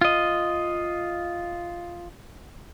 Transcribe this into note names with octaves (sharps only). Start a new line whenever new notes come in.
F4 D#5